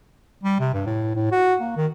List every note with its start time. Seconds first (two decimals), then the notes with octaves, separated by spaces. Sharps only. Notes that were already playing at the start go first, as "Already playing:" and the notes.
0.44 G3
0.60 C3
0.74 G2
0.86 A2
1.15 A2
1.31 F#4
1.61 A#3
1.77 D#3